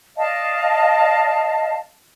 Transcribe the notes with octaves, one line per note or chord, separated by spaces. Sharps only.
D5 D#5 F5 A5